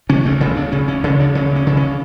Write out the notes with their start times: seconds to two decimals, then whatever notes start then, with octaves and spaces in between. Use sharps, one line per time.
0.09 C#3 C#4
0.25 D2 A3
0.40 C#3 B3
0.56 D2 D4
0.72 C#3 C#4
0.88 D2 C#4
1.04 C#3 C#4
1.20 D2 D4
1.35 C#3 C#4
1.51 D2
1.56 C#4
1.67 C#3
1.77 C#4